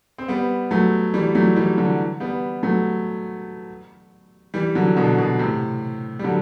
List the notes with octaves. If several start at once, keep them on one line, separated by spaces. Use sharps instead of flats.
C4
G3 B3
F#3 A3
E3 G3
F#3 A3
E3 G3
D3 F#3
G3 B3
F#3 A3
E3 G3
D3 F#3
B2 D3
B2
A2 C3
G3
D3 F#3